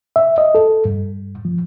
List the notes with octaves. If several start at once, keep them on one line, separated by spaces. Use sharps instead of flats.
E5
D#5
A4
G2
F3